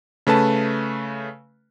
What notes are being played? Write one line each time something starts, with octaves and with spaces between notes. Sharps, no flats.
C#3 A3 B4 A5